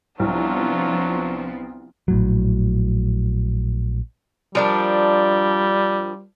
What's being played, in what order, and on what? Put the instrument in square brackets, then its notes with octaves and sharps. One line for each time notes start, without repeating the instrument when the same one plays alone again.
[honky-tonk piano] C2 [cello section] F3 B3 C4 [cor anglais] F#3 [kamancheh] D4 F4
[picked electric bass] A#1 A2 F#3
[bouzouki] F3 D4 A#4 [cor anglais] G3